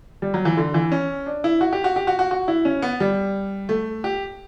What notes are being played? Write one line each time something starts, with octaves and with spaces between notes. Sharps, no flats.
G3
F#3
E3
D3
E3
C#4
D4
E4
F#4
G4
F#4
G4
F#4
F#4
F#4
E4
C#4
B3
G3
A3
G4